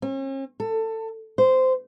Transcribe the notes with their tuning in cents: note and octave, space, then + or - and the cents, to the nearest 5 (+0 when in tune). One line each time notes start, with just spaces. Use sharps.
C#4 -45
A4 +20
C5 -15